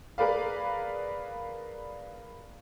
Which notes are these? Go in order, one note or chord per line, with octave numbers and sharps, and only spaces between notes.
G#4 A#4 B4 D5 F5